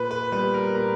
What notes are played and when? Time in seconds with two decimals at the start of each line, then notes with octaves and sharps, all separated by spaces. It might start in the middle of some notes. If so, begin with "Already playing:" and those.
Already playing: A#2 B4
0.11 B4
0.32 G3 B3 B4
0.54 A#4
0.75 A#2 A#4